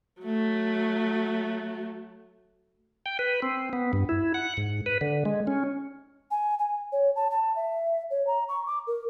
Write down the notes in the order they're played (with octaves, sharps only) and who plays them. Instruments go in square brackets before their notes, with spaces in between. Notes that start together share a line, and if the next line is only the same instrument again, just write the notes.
[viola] F#3 A3
[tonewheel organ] G5
B4
C4
B3
G2
E4
F#5
G#2
B4
D3
G#3
C#4
[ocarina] G#5
G#5
C#5
A5
A5
E5
C#5
A#5
C#6
D6
A#4